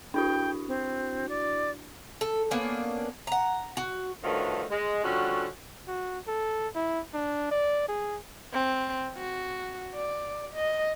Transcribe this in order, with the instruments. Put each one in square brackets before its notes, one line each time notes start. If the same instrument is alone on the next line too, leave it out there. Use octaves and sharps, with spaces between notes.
[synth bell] D4 E4 F#4 [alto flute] G5
[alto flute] C4
D5
[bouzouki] A4
A#3 B3 C#4 D4
F#5 A#5
F#4
[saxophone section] G2 D3 D#3 F3 F#3 A3
G#3
D3 F3 G3 C#4 F#4
[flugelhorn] F#4
A4
E4
D4
D5
G#4
[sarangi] C4
F#4
D5
D#5